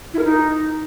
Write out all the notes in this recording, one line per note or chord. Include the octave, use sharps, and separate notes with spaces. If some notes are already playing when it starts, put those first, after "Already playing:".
E4
A#4
D#4